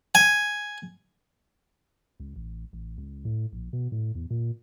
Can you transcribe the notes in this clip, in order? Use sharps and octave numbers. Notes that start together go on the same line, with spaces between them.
G#5
C#2
A1
A1
C#2
A2
A#1
B2
A2
E2
A#2